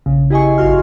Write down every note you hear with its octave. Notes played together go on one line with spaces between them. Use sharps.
A#1 C#3
E4 G4 G#4 D#5 G#5 C#6
G#1 F#2 F4 F#4 C6 F6